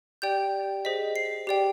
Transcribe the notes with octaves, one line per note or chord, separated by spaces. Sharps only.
G4 D5 G5 G6
G#4 C5 D#5 B6
C7
G4 D5 G5